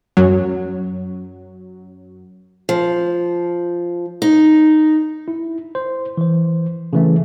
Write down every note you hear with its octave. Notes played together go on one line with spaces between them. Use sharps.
F#2 F#3
F3
D#4
E4
C5
E3 C5
C#3 E3 A3